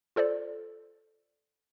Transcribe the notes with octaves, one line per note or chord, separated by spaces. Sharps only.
F4 A4 C5 D5